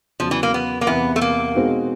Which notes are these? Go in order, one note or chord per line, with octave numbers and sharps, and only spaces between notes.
E2 C#3 F3 F#3
E3
A#3
B3
A#3
E2 C3 E3 B3
A3
A#3
B2 G#3 C4 D#4 F#4